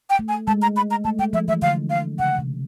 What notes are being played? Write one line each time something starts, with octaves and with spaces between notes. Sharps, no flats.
G5
A3
G#5
G#3 A5
A#5
B5
A#5
A3 A5
G#3 G5
F3 E5
E3 E5
D3 F5
F5
C#3 F#5
C3